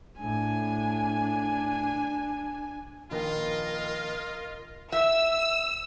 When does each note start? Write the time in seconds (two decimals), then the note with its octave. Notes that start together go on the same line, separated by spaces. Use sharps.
0.20 A2 D4 G#5
3.11 A#1 D#3 F4 A#4 B4 D#5
4.92 E5 E6